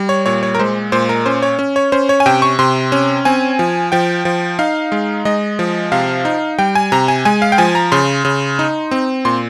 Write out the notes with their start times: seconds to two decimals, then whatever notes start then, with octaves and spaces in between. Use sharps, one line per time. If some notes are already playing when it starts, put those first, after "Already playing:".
Already playing: G3
0.09 C#5
0.26 A#2 C#5
0.43 C#5
0.55 A#4
0.59 G#3 C5
0.92 A#2 C5
1.09 A#4
1.26 C#4 C5
1.42 C#5
1.59 C#4
1.76 C#5
1.92 C#4 C5
2.09 C#5
2.20 G#5
2.26 C3 G5
2.42 C#6
2.59 C3 C6
2.92 C#4
3.25 C4 G#5
3.59 F3
3.92 F3 G5
4.25 F3
4.59 D#4 F5
4.92 G#3
5.25 G#3 D#5
5.59 F3
5.92 C3 F5
6.25 D#4
6.58 G3 G5
6.75 G#5
6.92 C3 A#5
7.08 G#5
7.25 G#3 G#5
7.42 F5
7.52 G5
7.58 F3 G#5
7.75 A#5
7.92 C#3 C6
8.25 C#3
8.59 D#4
8.91 C4
9.25 A#2 C6